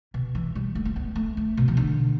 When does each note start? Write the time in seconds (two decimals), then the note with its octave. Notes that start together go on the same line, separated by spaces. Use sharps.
0.14 B2
0.35 E3
0.55 G3
0.75 A3
0.85 A3
0.96 B3
1.16 A3
1.37 A3
1.57 B2
1.68 E3
1.77 D3